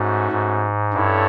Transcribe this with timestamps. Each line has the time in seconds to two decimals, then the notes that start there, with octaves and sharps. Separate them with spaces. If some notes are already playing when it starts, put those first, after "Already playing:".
Already playing: G#2 A3 C#4 F#4
0.32 G#2
0.93 G2 C#4 E4 A4 C#5